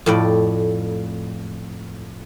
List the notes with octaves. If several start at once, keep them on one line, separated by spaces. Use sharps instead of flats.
F2 A2 D5